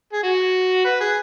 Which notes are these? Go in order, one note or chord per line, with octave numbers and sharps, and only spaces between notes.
G#4
F#4
B4
G#4